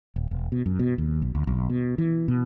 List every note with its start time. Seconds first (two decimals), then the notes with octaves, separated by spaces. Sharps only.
0.16 D#1
0.31 E1
0.52 B2
0.66 F#2
0.79 B2
0.98 D#2
1.22 B1
1.35 D2
1.47 B1
1.69 B2
1.98 E3
2.28 B2